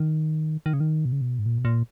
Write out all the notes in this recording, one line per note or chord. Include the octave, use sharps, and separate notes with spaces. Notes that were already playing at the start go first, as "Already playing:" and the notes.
Already playing: D#3
D#3
C#3
D#3
B2
C#3
B2
G#2
A#2
B2
A#2